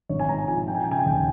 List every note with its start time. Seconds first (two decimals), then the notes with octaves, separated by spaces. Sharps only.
0.09 G#1 C#5
0.19 G#5
0.29 G#2 A#5
0.48 F3 G#5
0.67 F3 G5
0.75 G#5
0.84 G5
0.87 C#3 G#5
0.99 G5
1.06 D#2